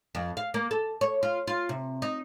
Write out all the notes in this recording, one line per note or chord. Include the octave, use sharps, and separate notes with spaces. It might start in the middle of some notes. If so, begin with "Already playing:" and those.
F2
F5
A#3
A4
C#5
F4
F4
C3
D#4